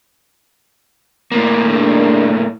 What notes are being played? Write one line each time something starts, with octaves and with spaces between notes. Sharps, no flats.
A2 A#3
D#3 G#3 D4